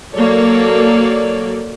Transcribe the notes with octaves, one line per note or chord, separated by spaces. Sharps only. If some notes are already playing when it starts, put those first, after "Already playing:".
F#3 A#3 A4 C#5 D5